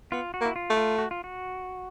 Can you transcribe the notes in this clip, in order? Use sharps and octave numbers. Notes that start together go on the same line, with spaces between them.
B3 F4
F#4
A#3
E4
F4
A3
F4
F#4
F4
F#4